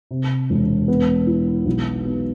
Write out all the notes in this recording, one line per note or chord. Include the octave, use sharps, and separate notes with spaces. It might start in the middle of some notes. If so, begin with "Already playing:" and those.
C3
E1
B3
E4
B1
B3